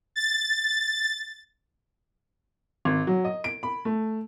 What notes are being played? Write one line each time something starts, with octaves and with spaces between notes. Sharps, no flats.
A6
G#1
F#3
D#5
D7
B5
A3